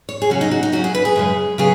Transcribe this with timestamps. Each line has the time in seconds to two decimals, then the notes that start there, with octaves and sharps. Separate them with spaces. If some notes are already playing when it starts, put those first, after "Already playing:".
0.09 C#5
0.22 G#4
0.30 C#3 F#3 C#4 F#4
0.41 D#4
0.51 F#4
0.63 D#4
0.72 C#3 F#3 C#4 F#4
0.84 G#4
0.95 B4
1.05 G#4
1.16 F#2 C#3 G#3
1.58 C#3 F#3 B3 G#4